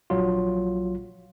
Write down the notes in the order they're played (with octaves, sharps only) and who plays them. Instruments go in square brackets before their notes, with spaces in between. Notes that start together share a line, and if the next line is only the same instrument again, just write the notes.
[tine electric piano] A#1 F#3 F4